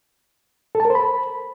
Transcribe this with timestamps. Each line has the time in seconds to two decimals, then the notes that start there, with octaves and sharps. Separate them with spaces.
0.75 A4
0.80 A5
0.85 A#4
0.90 C5
0.95 B5